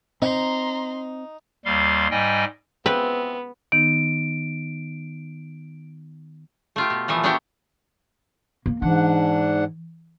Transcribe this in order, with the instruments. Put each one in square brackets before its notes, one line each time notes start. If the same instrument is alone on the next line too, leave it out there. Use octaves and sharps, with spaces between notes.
[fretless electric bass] C4 [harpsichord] D#4 [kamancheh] A#5 C6
[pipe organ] D#2 G3 F5 C6
G#2 G3 D#5 G5 G#5
[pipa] E3 F3 C4 [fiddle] B3 [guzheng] B4
[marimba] D#3 B3 D#4 [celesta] D7
[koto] A3 F4 G4
B2
A#2 E3 F3 A3 B3
B3 D4 E4 F#4 G4 G5
[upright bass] A#3
[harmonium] G#2 D4 F#5 [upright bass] E3